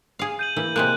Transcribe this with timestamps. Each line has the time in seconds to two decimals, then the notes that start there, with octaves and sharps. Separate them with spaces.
0.19 G#4 F5
0.39 G6 D#7 F#7
0.56 E3 A#3 E4
0.76 C3 G#3 A#3 F#6